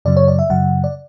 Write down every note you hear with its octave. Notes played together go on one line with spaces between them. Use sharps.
F#2 C#3 F#3 D5
C#5
D5
E5
F#2 C#3 F#3 F#5
D5